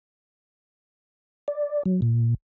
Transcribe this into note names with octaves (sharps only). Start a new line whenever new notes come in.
D5
F#3
A#2